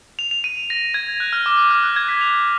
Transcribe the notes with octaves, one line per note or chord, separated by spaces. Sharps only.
F7
F7
D#7
A#6
G#6
F#6
F6
D6
D6
F6
F#6
G#6
B6
F7